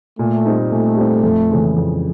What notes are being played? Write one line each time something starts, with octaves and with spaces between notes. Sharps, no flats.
A#2 A3
G3 C4 D#4
A#2 A3
G3 C4 D#4
F2
C#3 E3 G#3
F2